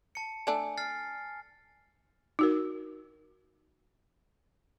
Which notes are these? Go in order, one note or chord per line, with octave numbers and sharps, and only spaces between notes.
A5 C#7
A3 D4 G#5
F6 A6 C7
D#4 F#4 A#4